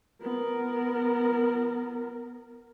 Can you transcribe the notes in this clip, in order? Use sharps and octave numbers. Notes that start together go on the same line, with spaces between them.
B3 A#4